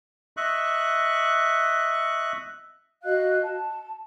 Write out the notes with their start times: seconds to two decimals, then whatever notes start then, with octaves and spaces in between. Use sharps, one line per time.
0.37 D#5 E5 C#6 F#6
3.04 F#4 D#5 F5 F#6
3.43 A5